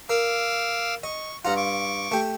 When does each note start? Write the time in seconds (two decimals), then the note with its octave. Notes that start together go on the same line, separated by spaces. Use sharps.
0.09 A#4 F5 D6 E6
1.03 D#5 C#6
1.45 G2 F4 F#5 A#5 F6
1.57 C#6 D6
2.12 A3 G4